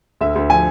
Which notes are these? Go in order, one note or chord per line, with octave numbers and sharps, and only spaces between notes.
D2 E5
D2
F3 G#5